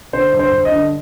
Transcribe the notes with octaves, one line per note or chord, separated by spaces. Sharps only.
D3 C5
G2
C5
G2
D#5
D3